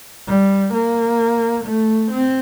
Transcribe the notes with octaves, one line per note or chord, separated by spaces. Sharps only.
G3
A#3
A3
C4